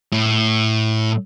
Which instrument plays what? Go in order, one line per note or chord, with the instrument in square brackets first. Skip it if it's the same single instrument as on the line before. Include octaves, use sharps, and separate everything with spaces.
[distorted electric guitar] A2